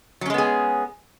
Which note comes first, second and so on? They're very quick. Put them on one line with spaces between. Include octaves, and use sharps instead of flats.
F#3 C#4 G#3 B3 G#4